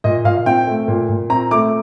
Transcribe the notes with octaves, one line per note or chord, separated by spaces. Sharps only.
A#2 D#5
A#2 F5
C4 G5
A3
A#2
A#2
C4 A#5
A3 D6